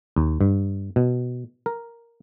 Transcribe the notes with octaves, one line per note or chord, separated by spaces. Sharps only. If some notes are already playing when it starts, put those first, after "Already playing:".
D#2
G2
B2
A#4